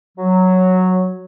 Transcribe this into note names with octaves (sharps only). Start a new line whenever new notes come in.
F#3